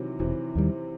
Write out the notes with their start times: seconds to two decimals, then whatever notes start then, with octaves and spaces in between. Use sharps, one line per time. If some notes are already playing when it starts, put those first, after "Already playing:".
Already playing: C3 D#3 E3 F#3
0.20 E1 C3 E3
0.55 D#2 D#3 G3